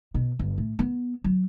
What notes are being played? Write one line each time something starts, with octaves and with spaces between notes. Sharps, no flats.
B2
G1
A2
B3
F#3